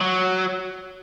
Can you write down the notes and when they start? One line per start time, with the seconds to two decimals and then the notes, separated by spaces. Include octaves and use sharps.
0.01 F#3